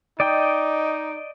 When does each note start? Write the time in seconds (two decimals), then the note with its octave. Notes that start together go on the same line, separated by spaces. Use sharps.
0.20 D#4 D5 D#5 G5